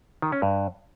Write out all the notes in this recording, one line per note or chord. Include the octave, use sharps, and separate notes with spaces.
D#3
C#4
G2